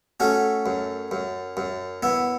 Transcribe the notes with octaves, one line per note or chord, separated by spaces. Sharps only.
A3 C#4 F#4
F#2
F#2
F#2
B3 E4